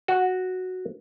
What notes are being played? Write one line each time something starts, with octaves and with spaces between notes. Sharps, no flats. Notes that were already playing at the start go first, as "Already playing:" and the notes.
F#4